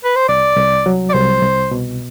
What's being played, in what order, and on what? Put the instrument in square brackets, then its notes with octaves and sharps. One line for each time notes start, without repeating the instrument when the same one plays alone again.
[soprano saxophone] B4
C5
[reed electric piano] C2 [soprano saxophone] D5
[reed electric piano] C2
F#3
[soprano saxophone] D5
[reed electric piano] C2 [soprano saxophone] C5
[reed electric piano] C2
B2